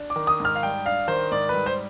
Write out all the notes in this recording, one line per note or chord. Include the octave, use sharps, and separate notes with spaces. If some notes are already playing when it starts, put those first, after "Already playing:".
Already playing: D4
D6
D#3
D#6
G#2 F6
F5
G3 G5
D4 F5
D#3 C5
G#2 D5
G3 B4
C5